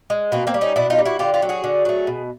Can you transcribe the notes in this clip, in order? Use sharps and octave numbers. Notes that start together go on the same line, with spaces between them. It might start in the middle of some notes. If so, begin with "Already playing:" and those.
G#3
B2 A#3 C4
A#3 C4
G3
C#4 D#4
B2 D4 E4
D#4 F4
G3
E4 F#4
D3 F4 G4
F4 G4
F#3 A3
F#4 G#4
D3
F#3 A3
B2